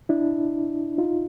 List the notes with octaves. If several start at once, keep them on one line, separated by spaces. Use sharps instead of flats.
D4 E4
D#4 F4